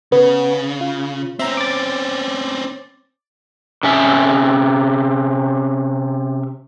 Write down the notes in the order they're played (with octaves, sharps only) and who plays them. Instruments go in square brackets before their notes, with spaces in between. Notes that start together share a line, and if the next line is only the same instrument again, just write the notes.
[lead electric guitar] C#3 [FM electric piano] B3
[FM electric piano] F4
[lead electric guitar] C4 C#4 [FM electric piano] E5 A#5
[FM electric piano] D6 A6
[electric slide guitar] C3 C#4 E5